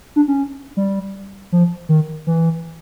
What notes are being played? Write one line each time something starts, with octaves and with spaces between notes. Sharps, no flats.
D4
C#4
G3
F3
D#3
E3